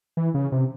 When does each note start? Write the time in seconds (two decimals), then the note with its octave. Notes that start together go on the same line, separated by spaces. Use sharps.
0.17 E3
0.34 C#3
0.52 C3